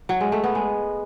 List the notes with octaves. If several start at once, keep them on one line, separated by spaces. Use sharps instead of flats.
F#3
G#3
A3
B3
G#3